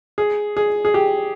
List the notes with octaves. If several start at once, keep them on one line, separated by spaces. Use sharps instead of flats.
G#4
G#4
G#4
G4